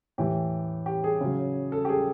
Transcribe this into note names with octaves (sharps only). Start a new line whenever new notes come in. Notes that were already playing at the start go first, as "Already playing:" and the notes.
A2 E3 G4
G4
G#4
C#3 F#3
A4
G4
G#4